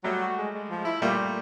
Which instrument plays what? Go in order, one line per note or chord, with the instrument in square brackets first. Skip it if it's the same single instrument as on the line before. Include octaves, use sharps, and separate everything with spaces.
[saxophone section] F#3 [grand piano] G3 A3
[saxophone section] F#4
G#3
G#3
F3
E4
[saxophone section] A#2 [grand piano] G3 A3
[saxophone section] A#2